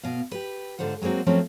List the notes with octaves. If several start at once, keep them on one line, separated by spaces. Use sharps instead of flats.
B2 F5
G4 B4
G#2 D3 F4 C5 F#5
F#3 G#3 A#3 C4 F#4
F3 F#3 A3 C4 C#4